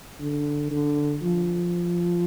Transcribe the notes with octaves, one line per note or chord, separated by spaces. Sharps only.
D3
D3
F3